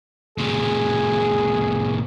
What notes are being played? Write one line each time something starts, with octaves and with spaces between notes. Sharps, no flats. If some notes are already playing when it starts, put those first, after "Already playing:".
A#2 C#3 G#4